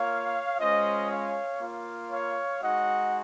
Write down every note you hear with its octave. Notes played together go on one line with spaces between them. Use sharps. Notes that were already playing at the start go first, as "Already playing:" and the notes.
Already playing: A#3 F4 C#5 F5
G#3 C#4 F4 C5 D#5
C#5 F5
A#3 F4
C#5 F5
G#3 D#4 F#4 D#5 F#5